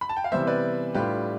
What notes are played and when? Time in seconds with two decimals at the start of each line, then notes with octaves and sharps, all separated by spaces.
0.01 B5
0.09 A5
0.17 G5
0.24 F5
0.32 C3 E3 G3 B3 C5 E5
0.47 B4 D5
0.95 A2 G3 D4 F4 G4 B4